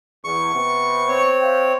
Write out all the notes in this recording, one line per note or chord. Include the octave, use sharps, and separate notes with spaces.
E2 C#6
C3 B3
C4 C#5
E5 F5 G5